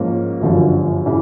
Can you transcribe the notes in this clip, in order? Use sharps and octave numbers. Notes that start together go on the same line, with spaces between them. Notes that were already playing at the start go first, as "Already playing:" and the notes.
Already playing: G#2 F3 A#3 C#4
G1 F#2 D3 F3
C#3 E3